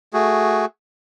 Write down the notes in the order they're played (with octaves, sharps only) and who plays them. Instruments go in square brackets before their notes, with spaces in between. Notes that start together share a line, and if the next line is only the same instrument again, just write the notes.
[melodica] A3 F#4 G#4